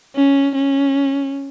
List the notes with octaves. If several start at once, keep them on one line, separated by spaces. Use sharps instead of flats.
C#4
C#4